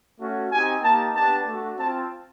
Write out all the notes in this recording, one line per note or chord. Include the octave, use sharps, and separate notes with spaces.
A3 C#4 F#4
C4 D#4 G4 G#5
A#3 D#4 G4 A5
B3 D4 G4 A5
A3 D4 F#4
C4 F4 A5